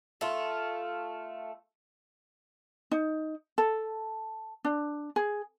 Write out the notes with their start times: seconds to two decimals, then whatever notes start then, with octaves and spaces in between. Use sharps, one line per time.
0.21 A3 F4
2.92 D#4
3.58 A4
4.65 D4
5.16 G#4